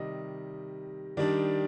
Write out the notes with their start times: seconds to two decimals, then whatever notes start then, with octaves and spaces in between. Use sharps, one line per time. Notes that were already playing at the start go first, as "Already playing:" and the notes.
Already playing: C3 D#3 G3 D#5
1.17 D#3 G3 D4 D5